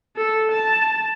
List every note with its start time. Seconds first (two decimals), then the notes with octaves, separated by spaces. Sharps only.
0.17 A4
0.51 A5